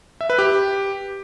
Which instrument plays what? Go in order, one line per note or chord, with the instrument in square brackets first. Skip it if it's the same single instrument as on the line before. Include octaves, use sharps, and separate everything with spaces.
[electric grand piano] E5
B4
G4